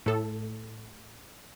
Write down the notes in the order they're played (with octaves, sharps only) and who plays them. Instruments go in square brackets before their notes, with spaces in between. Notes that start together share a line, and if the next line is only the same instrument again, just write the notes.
[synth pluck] A2 A4